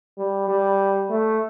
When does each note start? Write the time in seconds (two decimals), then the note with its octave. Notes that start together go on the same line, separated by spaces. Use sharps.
0.18 G3
0.48 G3
1.10 A3